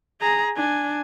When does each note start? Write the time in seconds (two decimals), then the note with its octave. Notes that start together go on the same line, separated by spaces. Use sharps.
0.21 G#4 A#5
0.56 D4 G#5